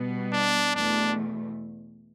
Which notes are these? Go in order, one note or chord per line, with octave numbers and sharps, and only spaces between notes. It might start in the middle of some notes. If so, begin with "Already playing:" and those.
Already playing: B2 G3 B3
D4
E2 B2 A3 D4